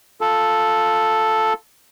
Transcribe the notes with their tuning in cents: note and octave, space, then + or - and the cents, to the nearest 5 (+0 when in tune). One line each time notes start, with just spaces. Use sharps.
F4 +0 A4 +0